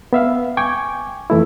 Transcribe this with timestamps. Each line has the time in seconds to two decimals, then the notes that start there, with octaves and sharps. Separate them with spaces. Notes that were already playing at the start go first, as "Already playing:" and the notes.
0.13 B3 E5 F5
0.57 G5 G#5 C#6 D6 G#6
1.30 F2 E3 A3 E4